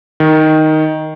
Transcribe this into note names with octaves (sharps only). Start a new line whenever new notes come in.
D#3